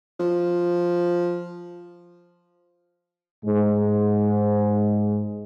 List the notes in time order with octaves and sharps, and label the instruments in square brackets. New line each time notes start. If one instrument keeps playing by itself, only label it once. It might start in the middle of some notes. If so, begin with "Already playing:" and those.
[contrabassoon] F3
[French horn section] G#2 G#3